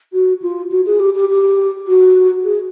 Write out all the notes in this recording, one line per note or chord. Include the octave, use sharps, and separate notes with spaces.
F#4
F4
F#4
G#4
G4
G4
G4
F#4
G#4